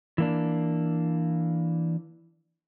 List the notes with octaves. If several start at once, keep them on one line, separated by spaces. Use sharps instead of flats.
E3 A#3 D4